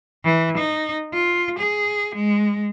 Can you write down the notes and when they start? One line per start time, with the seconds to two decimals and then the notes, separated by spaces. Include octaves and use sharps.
0.25 E3
0.57 D#4
1.13 F4
1.59 G#4
2.15 G#3